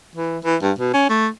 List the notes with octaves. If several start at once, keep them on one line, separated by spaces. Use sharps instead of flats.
E3
E3
G2
B2
C#4
A3